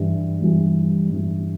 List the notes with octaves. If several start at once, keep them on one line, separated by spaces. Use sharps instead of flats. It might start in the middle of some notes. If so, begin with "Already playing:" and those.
Already playing: G2 E3 G3
G2 E3 G3
G2 E3 G3